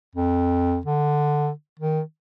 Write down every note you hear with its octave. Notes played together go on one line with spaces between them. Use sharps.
F2
D3
D#3